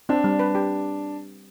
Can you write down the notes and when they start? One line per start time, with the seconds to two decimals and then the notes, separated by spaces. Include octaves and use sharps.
0.09 C4 D4
0.24 G3
0.39 B4
0.55 G4